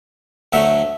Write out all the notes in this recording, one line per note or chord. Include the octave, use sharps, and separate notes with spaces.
D2 D3 F#3 A3 E5